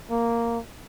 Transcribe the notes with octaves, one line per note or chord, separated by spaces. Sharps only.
A#3